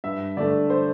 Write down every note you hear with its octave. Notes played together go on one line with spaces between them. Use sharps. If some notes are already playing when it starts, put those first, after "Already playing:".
G2 E5
D3 A3 D5
C5